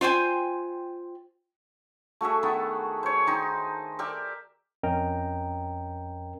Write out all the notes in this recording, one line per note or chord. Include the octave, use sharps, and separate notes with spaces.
F4 C5 G5 G#5
A3 F#4 G#4 E5
D#3 B3
C5 C#5
D#3 D#4 C6
G4 A#4 D5 E5
F2 C#4 A#4 D#5 G5 A#5